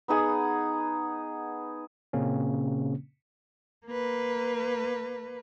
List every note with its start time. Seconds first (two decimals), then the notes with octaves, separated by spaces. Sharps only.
0.08 B3 D#4 G#4 F#5
2.13 A#2 C#3 A#3 C4 C#4
3.87 A#3 B4